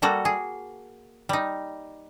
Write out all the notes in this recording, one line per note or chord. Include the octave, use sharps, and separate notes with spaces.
G3 A#3 F#4 A4
G#4
G3 D#4